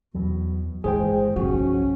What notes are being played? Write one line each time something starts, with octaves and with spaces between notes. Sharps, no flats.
E2 B2 E3 F#3
G1 E3 G#3 E4 G#4 C5 G5
B1 F3 C#4 F#4